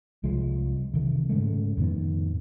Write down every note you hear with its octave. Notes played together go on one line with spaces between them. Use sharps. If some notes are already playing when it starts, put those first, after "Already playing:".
C2 F3 G#3
C3 D#3 E3
G#2 C#3 G#3 A3
F2 A2 D#3 B3